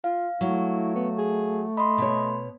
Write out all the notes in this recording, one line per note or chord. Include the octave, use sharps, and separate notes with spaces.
F4 F5
F#3 A3 E4
B3
G#4
D#5 B5 C6
B2 C#5